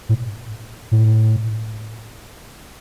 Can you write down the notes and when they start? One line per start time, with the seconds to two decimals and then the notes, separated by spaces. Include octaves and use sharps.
0.09 A2
0.92 A2